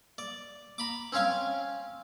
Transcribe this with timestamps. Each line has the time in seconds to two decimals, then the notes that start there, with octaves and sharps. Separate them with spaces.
0.18 D5
0.78 A#5 B5 D6
1.12 C4 C#4 C#5 F5 G#5